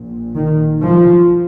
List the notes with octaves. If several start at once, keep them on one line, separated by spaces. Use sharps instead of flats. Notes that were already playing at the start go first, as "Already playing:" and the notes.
Already playing: A#1 A#2
D#3
F3